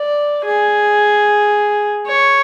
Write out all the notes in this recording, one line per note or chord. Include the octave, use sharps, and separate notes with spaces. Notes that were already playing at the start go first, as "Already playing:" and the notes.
Already playing: D5
G#4
C#5